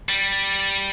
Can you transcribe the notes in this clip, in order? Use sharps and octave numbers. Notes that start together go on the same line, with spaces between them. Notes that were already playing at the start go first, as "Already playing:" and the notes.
G3